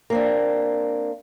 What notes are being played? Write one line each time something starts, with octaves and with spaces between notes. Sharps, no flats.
A#3 C4 D4